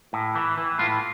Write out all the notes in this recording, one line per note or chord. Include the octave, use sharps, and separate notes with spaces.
A2
E3
E3
A2 F4